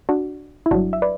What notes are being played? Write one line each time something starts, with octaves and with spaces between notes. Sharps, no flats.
D4 F#4
E4
G1 G2 F#3 D4 F#4
E5
B4 D5